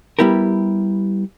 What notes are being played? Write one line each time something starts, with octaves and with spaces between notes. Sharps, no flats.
G3 B3 E4 G4 A#4